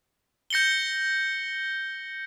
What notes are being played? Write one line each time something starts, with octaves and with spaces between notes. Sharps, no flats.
G6 A#6 C#7 F#7 G7